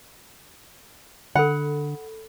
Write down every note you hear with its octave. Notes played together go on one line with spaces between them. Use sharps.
D3 A4 F#5 B5